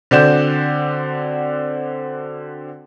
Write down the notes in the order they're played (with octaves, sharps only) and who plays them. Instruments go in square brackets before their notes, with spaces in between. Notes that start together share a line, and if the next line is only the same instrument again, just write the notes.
[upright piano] D3 C4 F#4 D5 G6 E7